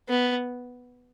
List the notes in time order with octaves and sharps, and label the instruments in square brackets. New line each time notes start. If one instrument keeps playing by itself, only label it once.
[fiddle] B3